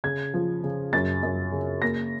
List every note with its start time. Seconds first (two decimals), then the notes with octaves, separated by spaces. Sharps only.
0.04 C#3 G#6
0.34 F3
0.64 C#3
0.93 F#2 A6
1.23 F#2
1.52 C#3
1.82 A#3 A#6